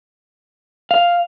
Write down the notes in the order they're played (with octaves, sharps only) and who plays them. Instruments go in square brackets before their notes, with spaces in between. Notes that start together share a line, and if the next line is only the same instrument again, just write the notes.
[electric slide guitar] F5